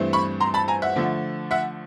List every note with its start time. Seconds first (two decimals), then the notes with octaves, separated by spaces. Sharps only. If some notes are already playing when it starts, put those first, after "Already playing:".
Already playing: G2 E3 A3 C4
0.13 B5 C#6
0.40 A#5 C6
0.54 A5 B5
0.68 G#5 A#5
0.82 E5 F#5
0.96 D3 F3 A3
1.51 E5 F#5